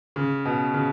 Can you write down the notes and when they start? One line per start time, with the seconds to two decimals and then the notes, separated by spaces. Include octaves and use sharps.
0.16 C#3
0.45 B2
0.74 C#3